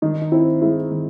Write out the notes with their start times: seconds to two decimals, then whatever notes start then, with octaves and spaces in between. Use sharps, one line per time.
0.02 D#3 D#4
0.22 D#4
0.32 C4 E4
0.62 G#3 E4
0.91 D#3